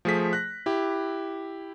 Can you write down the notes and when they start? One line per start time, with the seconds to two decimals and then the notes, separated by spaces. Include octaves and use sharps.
0.05 F3 A3 G#4 C5 B6
0.33 F#6 A#6
0.66 E4 G4